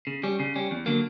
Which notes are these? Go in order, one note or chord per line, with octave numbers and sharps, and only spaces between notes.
C#3
G3 C#4
C#3
G3 C#4
E2
D3 F#3 A#3